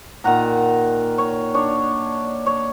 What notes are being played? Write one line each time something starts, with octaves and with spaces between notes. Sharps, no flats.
A#2 D#3 F#5 A#5
C#5
D4 C#5
C#5